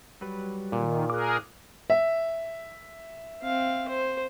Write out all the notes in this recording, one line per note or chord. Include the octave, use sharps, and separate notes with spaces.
F#3 G3 B4
A#2 D#3
G#4 A#4 D6 F#6
E5
C4 F5
C5